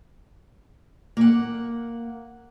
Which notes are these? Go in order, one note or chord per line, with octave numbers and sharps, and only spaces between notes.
A#3 F#5